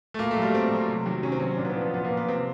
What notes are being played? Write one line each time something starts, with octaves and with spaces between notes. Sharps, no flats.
A3
A#2 A#3
A3
F#3
G3
A#2 C4
F#3
C3
D#3 F#3
C3 C#4
C4
D#3 F#3 C#4
A#2 D4
B3
C4
F3
B3
A#2 B3
A#3
F3
B3
C3 C4